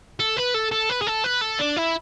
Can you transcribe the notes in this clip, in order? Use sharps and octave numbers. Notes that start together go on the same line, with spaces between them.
A4
B4
A4
A4
B4
G#4
A4
B4
A4
D4
E4